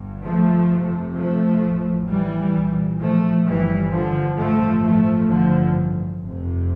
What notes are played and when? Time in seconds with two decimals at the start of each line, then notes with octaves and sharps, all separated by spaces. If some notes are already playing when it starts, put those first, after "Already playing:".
Already playing: G1 G2
0.24 F3 A3
0.70 F1 F2 C3
1.16 F3 A3
1.62 A1 A2
2.09 E3 G3
2.54 C2 A#2
3.00 F3 A3
3.46 G1 G2 E3 G3
3.92 D3 F3
4.37 A1 G2 F3 A3
4.84 F3 A3
5.30 A1 G2 D3 F3
6.21 F1 F2 C3